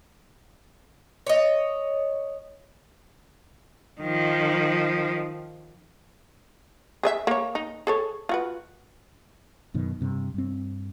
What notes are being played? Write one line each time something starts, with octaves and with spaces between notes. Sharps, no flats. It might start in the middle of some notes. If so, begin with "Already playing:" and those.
C#5 D#5
D#3 F3
G#4 D#5 E5
A#3 C#5
D#4
G#4 A4 C#5
F4 F#4 B4
F#2 B2 D#3
G2 C3
G2 C4